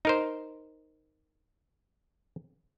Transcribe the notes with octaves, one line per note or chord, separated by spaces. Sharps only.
D#4 A#4 C5